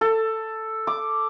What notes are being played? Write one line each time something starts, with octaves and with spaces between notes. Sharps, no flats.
A4
D6